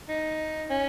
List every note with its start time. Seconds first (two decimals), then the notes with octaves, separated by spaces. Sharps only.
0.09 D#4
0.70 C#4